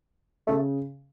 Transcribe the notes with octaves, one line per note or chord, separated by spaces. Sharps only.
C#3 A3